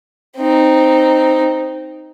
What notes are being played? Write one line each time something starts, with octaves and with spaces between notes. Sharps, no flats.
C4 D#4